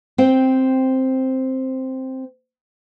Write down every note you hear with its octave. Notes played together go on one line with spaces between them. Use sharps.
C4 C5 G5